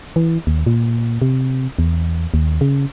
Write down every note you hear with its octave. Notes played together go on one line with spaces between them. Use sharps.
E3
D#2
A#2
C3
E2
D#2
C#3